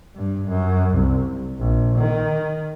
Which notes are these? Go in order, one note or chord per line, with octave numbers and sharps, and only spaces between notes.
G2
F#2
C2
A#1
D#3